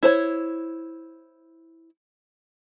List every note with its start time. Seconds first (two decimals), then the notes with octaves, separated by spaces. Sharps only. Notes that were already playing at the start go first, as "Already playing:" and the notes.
0.03 E4 C5 C#5